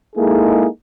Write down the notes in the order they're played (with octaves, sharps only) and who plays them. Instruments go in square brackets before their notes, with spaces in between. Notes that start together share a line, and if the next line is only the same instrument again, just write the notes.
[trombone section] G#3 A#3 D#4 E4 G#4 A4